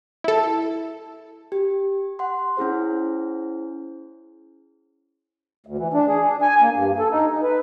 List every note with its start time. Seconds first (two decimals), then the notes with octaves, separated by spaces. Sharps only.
0.24 E4 A4
1.52 G4
2.19 F#5 C6
2.57 C#4 E4 G#4 C5
5.67 D2
5.78 E3
5.94 D4
6.08 G#4
6.26 D4
6.42 G#5
6.61 A#3
6.75 G2
6.99 A4
7.12 D#4
7.30 D#4
7.43 B4